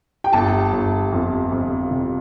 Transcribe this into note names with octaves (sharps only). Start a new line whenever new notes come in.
G5
G1 A5
G1
F2
F2
C3